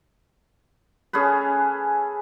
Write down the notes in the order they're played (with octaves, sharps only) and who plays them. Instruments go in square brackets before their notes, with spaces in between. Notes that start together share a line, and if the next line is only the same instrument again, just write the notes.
[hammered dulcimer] C#4 G#4 A4 B4